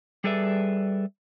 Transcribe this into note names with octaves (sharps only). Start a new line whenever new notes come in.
G3 G#4 A4 B4 D5 E5